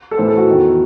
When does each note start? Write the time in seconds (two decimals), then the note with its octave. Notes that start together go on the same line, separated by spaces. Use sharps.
0.11 A4
0.17 A2 E3 C5
0.28 A4
0.37 F#4
0.47 E2 D#3